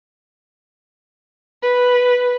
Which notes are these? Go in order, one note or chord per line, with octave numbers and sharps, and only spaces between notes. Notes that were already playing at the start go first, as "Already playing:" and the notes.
B4